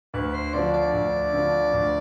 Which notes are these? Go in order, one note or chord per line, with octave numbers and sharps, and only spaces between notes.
D2 B4
C5
D3 F3 D5
D5
D2
D3 F3
D2